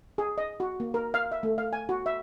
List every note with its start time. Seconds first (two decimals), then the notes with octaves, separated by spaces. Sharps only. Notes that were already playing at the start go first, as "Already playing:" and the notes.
0.18 G#4
0.38 D#5
0.60 F#4
0.80 A#3
0.94 A#4
1.14 F5
1.32 E5
1.43 A3
1.58 F5
1.73 G#5
1.89 F#4
2.06 E5